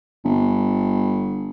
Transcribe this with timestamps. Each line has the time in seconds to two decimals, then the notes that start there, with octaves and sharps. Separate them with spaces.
0.24 G1